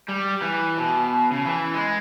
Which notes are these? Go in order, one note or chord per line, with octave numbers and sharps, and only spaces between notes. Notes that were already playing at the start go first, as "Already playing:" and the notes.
G3
E3
B2
C#3
E3
G#3